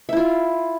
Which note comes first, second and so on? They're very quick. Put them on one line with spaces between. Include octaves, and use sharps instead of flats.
E5 E4 F4